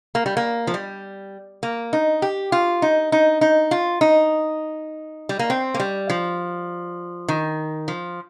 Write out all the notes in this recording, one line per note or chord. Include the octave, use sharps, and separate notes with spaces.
A#3
G3
A#3
F3
G3
A#3
D#4
G4
F4
D#4
D#4
D#4
F4
D#4
G3
A#3
C4
A#3
G3
F3
D#3
F3